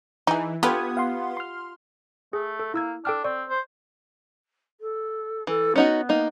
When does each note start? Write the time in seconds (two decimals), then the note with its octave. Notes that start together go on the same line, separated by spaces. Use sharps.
0.27 E3 D#4 G#4
0.63 B3 F4 G4 A4 B4 D#6 G#6
0.97 F5 F#5 C6
1.37 C6 F6
2.33 A3 G#4
2.59 A4
2.74 A#3 E4 E6 G#6
3.05 D4 A4 G5 F6
3.24 C4 D5 C#6
3.50 C5
4.80 A4
5.47 E3 A4
5.76 B3 C#4 D#4 F#4
6.09 A#3 D#4